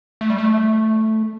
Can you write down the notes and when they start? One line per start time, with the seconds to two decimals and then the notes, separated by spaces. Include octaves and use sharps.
0.21 A3
0.30 G3
0.38 A3